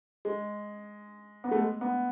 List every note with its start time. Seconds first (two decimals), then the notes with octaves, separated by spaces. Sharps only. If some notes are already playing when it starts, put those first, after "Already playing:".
0.25 G#3
1.44 B3
1.51 A3
1.59 G#3
1.81 B3